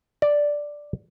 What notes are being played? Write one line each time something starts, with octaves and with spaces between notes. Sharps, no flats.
D5